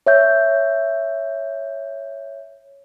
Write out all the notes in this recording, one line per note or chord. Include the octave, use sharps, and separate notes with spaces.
C#5 E5 G6